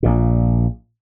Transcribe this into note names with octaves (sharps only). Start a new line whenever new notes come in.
A#1 A#2